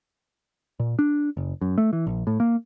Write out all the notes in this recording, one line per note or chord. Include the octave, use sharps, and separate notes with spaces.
A#2
D4
F#1
F#2
A3
E3
A#1
A2
A#3